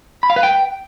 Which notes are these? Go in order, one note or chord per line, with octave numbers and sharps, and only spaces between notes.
B5
F5
B4
G5